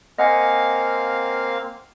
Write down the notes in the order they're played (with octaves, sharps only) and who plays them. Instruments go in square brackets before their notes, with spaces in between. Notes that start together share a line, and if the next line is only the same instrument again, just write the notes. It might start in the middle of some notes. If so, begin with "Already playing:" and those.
[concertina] A#3 C4 F5 [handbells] D#5 F#5 G#5